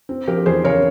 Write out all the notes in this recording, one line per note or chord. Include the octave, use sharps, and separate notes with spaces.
C4
F3 G4 A#4
E2 G#4 C5
C#3 A#4 C#5